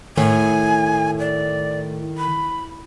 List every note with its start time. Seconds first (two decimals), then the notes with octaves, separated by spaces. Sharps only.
0.17 A2 D#3 G#5
1.19 D5
2.18 B5